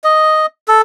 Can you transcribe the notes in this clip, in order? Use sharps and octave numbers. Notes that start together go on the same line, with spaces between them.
D#5
A4